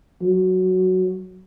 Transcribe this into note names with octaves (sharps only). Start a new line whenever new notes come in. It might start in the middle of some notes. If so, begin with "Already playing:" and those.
F#3